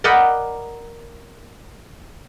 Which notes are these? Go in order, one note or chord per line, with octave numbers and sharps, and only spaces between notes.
A#4 D5 D#5 F#5 G5 B5